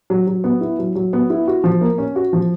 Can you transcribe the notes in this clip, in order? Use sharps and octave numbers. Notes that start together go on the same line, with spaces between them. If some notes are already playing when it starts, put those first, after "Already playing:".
F#3
F#3
B3
E4
F#3
F#3
B3
E4
F#4
F3
A#3
C#4
F#4
F3